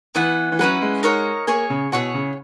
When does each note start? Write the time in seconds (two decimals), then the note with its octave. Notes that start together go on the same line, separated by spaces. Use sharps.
0.15 E3 B3 E4 B4 F#5
0.52 E3
0.59 F#3 C#4 E4 B4 F#5
0.82 G#3
1.03 D#4 A#4 C#5 F#5
1.47 A#3 G#4 C#5 G#5
1.70 C#3
1.92 B2 E4 G#4 C#5 F#5
2.14 C#3